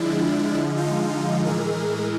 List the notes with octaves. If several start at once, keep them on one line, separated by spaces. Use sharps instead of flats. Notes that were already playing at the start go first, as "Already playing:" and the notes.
Already playing: D3 F3 G#3 D4 E4
D#4 F4
A2 E3 G#3 G#4 A#4